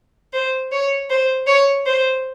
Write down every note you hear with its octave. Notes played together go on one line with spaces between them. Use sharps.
C5
C#5
C5
C#5
C5